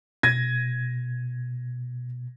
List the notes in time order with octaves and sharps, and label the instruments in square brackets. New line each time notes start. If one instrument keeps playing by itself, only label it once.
[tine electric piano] B2 [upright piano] G#6 A#6 D#7